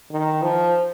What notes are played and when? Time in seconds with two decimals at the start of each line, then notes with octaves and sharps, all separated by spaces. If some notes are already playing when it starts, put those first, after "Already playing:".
0.11 D#3
0.42 F3